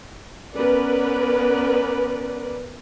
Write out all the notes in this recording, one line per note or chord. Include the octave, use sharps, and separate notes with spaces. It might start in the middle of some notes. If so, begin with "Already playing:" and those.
B3 C#4 A#4 B4 D5